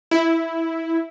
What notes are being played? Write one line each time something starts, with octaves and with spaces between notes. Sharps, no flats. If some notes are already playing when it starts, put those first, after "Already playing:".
E4